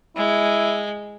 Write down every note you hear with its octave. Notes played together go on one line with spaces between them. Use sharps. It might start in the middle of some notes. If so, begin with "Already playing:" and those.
G#3 E4